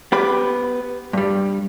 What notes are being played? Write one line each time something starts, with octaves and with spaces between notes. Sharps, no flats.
B3 G4 B5
G2 G3